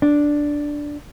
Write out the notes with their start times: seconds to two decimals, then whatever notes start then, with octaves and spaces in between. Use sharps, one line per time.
0.02 D4